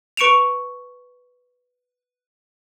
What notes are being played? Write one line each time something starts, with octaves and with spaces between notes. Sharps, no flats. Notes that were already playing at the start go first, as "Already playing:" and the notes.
B4 C#6 C#7 D7 E7 F7